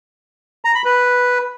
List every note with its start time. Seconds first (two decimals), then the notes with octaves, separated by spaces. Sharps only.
0.65 A#5
0.75 B5
0.85 B4